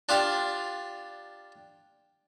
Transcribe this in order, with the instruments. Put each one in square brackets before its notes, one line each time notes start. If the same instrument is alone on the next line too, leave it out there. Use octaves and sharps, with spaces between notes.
[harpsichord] D4 F4 G4